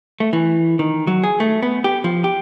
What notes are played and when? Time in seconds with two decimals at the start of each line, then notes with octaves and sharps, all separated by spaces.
0.20 A3
0.33 E3
0.79 D#3
1.07 F#3
1.24 G#4
1.40 A3
1.62 B3
1.84 G4
2.04 F3
2.24 G4